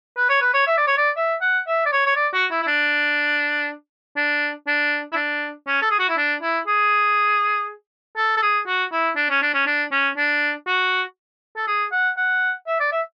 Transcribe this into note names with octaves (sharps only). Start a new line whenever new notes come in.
B4
C#5
B4
C#5
E5
D5
C#5
D5
E5
F#5
E5
D5
C#5
C#5
D5
F#4
E4
E4
D4
D4
D4
E4
D4
C#4
A4
G#4
F#4
E4
D4
E4
G#4
A4
A4
G#4
F#4
E4
D4
C#4
D4
C#4
D4
C#4
D4
F#4
A4
G#4
F#5
F#5
E5
D5
E5